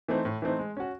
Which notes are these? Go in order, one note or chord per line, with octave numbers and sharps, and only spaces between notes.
E3 A3 C4 D#4
A2
E3 A3 C4 D#4
G#3
C#4 F#4